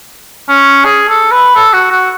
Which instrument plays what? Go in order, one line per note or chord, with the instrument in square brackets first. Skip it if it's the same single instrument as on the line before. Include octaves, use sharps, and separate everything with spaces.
[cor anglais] C#4
G#4
A4
B4
A4
F#4
F#4